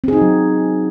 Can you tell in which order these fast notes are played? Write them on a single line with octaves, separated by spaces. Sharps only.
C4 G#4 D#4 F#4 F#3